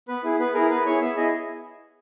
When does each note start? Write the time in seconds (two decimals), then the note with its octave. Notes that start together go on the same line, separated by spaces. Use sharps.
0.08 B3 B4
0.24 E4 G#4
0.39 B3 B4
0.54 E4 G#4 A#4
0.70 B3 B4
0.86 E4 G#4 C#5
1.01 B3 E5
1.17 E4 G#4 D#5